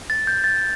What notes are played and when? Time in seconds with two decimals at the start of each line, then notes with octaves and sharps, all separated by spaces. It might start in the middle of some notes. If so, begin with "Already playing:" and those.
0.10 A6
0.27 G6
0.44 A6